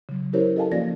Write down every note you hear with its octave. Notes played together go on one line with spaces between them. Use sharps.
C#3 F#3
C#4 E4 G4 A#4 C5 C#5
A4 D#5 F5 G#5 A5
F3 A#3 C#4 F#4 D5 A#6